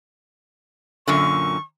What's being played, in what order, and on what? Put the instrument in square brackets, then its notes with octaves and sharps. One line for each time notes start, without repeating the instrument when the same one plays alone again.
[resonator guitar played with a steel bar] F#2 A#2 D3 [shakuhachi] C#6